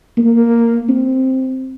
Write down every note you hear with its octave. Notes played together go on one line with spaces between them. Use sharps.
A#3
C4